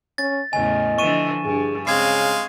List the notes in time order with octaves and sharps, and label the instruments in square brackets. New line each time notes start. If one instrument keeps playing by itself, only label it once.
[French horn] C#4 [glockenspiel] A6
[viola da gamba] E2 A2 C#3 [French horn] D#5 [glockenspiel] G#5
[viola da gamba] D3 E3 F3 [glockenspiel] C#6 D#7 E7
[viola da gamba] G2 [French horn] G#4
[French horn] C#3 [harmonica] G#3 F5 [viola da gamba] C4 [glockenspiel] G#6 C7